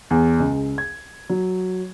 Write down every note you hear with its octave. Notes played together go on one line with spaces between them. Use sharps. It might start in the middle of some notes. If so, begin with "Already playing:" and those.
E2
C#2
G#6
F#3